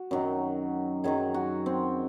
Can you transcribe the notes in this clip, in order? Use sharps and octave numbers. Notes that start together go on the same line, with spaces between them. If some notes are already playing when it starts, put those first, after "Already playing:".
Already playing: F#4
F#2 D#3 F#3
F#2 D#3 F#3 G#4
F#4
C4